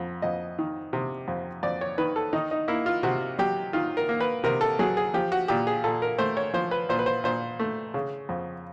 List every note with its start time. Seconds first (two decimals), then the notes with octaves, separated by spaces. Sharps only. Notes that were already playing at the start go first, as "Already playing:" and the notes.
Already playing: F2
0.22 F2 D#5
0.59 D#3
0.93 C3
1.28 F2
1.63 F2 D5
1.81 C#5
1.98 D#3 B4
2.16 A4
2.33 D#3 D#4
2.51 D#4
2.68 A#3 E4
2.86 F4
3.03 C3 F#4
3.39 F#3 G4
3.73 D#3 F4
3.97 A#4
4.09 A#3
4.20 B4
4.44 C3 A#4
4.61 A4
4.79 F#3 G#4
4.97 G#4
5.14 F3 G4
5.32 F#4
5.48 A#2 G4
5.67 G#4
5.84 A#2 A4
6.02 A#4
6.18 A3 C5
6.37 C#5
6.54 F3 C5
6.71 B4
6.89 A#2 C5
6.99 B4
7.06 C5
7.24 A#2 C5
7.59 A3
7.94 C#3
8.29 F2